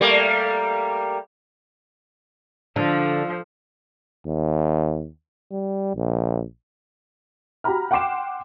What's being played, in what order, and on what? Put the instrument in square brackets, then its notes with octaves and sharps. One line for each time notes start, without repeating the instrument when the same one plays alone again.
[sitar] G3 A3 A#3
[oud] D3 [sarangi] F3
[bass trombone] D#2
G3
A#1
[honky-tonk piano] F#4 G4 A#5 B5 F6
F#5 G5 C6 D6 C7 E7